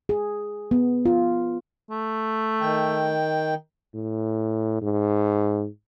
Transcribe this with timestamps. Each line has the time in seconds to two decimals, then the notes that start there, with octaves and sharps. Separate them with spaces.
0.09 G#4
0.71 B3
1.06 F4
1.91 A3
2.61 D#3 G5
3.95 A2
4.82 G#2